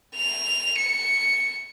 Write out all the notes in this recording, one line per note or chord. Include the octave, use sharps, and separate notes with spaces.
F7
C#7